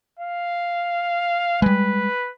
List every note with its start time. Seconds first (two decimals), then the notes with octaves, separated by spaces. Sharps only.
0.19 F5
1.62 G3 G#3 B4